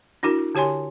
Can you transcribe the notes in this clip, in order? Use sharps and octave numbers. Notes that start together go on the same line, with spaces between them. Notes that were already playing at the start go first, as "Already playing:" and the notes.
D4 E4 F#4 A#4
D3 G4 C#5 G#5 C6